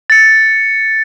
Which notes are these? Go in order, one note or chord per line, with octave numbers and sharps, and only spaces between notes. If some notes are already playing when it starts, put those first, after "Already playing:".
A6 C#7